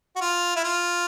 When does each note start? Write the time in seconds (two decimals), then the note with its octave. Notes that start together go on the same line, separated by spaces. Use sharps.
0.16 F#4
0.21 F4
0.56 E4
0.64 F4